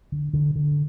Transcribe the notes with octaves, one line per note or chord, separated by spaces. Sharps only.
D3
D3
D3